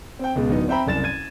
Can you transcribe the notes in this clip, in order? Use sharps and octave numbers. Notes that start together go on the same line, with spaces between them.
C4 G5
C#2 B2 G#3
D1 B3 D#4
C4 C5 E5 G5 A#5 B5
F#1 C2 A6 E7
G#6 D#7